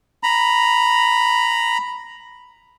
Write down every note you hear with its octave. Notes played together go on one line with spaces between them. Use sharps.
A#5 B5